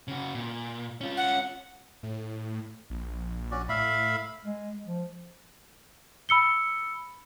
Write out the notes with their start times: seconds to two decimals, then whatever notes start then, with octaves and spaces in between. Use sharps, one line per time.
0.08 C#3 F#4
0.35 A#2
1.01 C#4 F4
1.17 F#5
2.03 A2
2.90 A#1
3.51 C#4 F#4 D5
3.69 A2 E5 F5 B5
4.45 G#3
4.85 F3
6.29 B5 E6 C#7 G7